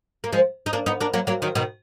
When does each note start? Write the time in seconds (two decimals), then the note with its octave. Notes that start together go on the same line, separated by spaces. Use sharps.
0.24 A#3
0.33 F3 G#3
0.66 D#4
0.73 A#3 D4
0.86 B3 D#4
1.01 A#3 D4
1.14 F#3 A#3
1.27 F#3 A#3
1.42 D#3 F#3
1.55 B2 D#3